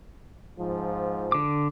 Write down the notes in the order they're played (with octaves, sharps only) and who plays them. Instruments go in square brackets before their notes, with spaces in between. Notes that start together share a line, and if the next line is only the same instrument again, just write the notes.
[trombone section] G#2 F3
[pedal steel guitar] D3 D6